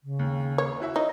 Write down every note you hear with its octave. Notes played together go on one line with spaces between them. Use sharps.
C#3
D#2
C#5
E4 F#4 E5
D#4 C#5 D#5